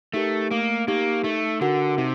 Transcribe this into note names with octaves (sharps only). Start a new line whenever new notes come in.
A3 D#4 G4 A#4
A3 A#3
A#3 D#4 G4 A#4
A3 D#4
D3 F#4 A#4 F#5
C3 D#4